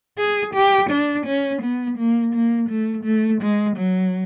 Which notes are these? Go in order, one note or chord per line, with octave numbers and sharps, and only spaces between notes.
G#4
G4
D4
C#4
B3
A#3
A#3
A3
A3
G#3
F#3